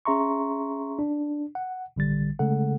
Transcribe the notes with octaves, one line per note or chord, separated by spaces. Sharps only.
C#4 G#4 E5 A#5 C6 C#6
D4
F#5
A1 D3 G3 A6
C#3 G#3 A3 A4 F#5